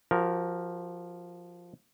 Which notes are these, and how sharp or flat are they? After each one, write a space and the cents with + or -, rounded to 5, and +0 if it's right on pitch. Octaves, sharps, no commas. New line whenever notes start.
F3 +0 F#4 +40 A#4 +0